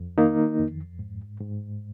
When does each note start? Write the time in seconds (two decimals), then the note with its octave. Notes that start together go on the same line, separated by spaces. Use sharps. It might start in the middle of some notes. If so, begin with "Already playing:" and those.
Already playing: F2
0.17 D#3 A#3 D#4
0.58 F2
0.99 G#2
1.40 G#2